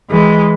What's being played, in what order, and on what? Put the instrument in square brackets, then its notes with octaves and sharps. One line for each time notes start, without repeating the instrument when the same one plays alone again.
[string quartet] E3 G#3